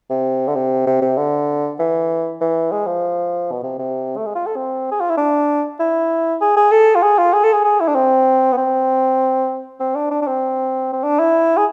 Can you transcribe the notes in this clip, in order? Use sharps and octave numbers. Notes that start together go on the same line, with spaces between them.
C3
D3
C3
C3
C3
D3
E3
E3
G#3
F3
B2
C3
C3
A3
G#3
F4
A4
C4
G#4
F4
E4
D4
E4
G#4
G#4
A4
F4
G#4
F4
G#4
A4
G#4
G#4
E4
D4
C4
B3
C4
C4
D4
D4
D4
C4
C4
D4
E4
G#4